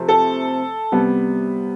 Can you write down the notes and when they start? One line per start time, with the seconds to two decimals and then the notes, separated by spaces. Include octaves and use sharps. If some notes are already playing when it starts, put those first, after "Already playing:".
Already playing: C3 F3 A3
0.08 A4
0.92 C3 G3 B3